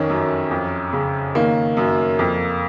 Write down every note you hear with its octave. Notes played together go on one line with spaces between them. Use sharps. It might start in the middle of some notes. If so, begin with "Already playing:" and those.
Already playing: F2 D#3 C#4
F#2
F2
C#3
D#3 A#3
F#2
F2